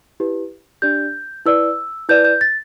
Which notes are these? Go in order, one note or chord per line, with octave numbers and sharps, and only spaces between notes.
E4 G4 B4
D4 G4 D5 G6
E4 B4 D5 E6
E4 B4 D5 G6
G6
A6